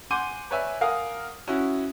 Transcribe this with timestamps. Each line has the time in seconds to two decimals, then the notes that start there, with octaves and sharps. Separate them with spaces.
0.10 F#5 G#5 C6 D6 G6 D#7
0.51 B4 C#5 D5 E5 G#5
0.81 A#4 F5 F#5 G#5 D#6
1.48 C#4 E4 F#4